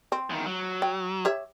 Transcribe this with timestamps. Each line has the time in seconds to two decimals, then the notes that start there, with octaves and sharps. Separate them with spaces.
0.12 C4
0.30 E2 D#3
0.46 F#3
0.82 G5
1.25 G4 C#5 E5